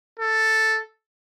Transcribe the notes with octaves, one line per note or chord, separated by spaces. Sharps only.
A4